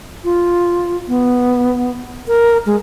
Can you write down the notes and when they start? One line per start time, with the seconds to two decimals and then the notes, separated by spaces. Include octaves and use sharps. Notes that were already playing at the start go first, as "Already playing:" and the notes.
0.24 F4
1.08 B3
2.28 A#4
2.66 G#3